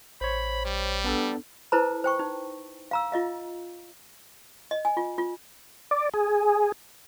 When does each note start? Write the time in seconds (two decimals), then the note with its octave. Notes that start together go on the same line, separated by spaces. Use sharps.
0.21 A1 C5 C#5 B5
0.65 G3
1.04 B3 D4 A4
1.72 E4 A4 B4 C5 A5 A#5
2.04 C5 G5 C#6
2.19 D#4
2.91 F5 A#5 E6
3.12 F4 D#5 F5
4.71 D#5
4.85 G#5
4.97 F4
5.18 F4
5.91 D5
6.14 G#4